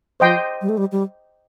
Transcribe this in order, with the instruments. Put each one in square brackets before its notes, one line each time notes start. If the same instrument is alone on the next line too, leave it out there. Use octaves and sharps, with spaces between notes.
[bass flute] F3 [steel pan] C5 D#5 G5 C6
[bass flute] G3
A3
G3
G3